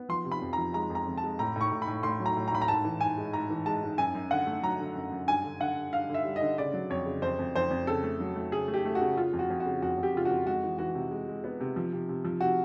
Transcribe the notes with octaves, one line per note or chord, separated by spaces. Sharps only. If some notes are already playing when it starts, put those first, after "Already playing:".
Already playing: B3
F3 C6
C3
B5
F2
F3 A#5
G#3 A#5
F2
A#5
F2
A5
G#3
A2 A#5
A2 C#6
A2
B5
A2
A2 C6
F#3
A#5
A2
A#5
A2 B5
A#5
G#2 A5
E3
G#2 G#5
G#3
G#2 A#5
E3
G#3 A5
G#2
F#2 G#5
F#2
D3 F#5
A3
F#3 A#5
D3
F#2
F#2
G2 G#5
D3
D3 F#5
G2
G2 F5
D3 E5
G3
D#5
D3
C#3 D5
F#3
F2 C#5
C#3
F2 C5
F2
F2 C5
F2
C#3 A4
A3
F#3
A3
C#3 G#4
A3
G4
A3
F#4
C#3
C#3 F4
F2
F#4
F2
F#4
C#3
F2 F#4
F2
G4
C#3 F4
F2 F#4
G#3 F#4
E3
E3 F#4
C3
G#3
G#3
B3
C3
F3
C3
C3
F3
C3 F#4